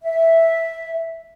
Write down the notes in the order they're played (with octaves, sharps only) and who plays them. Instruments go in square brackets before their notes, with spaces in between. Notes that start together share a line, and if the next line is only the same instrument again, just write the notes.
[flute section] E5